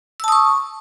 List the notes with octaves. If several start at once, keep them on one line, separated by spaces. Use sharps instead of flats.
A5 C#6 D#6 E6